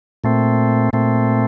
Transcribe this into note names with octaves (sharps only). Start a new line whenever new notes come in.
A#2 A3 C4
A#2 A3 C4